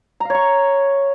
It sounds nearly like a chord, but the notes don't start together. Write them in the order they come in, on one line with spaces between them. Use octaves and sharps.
A#5 F5 C#5 C#6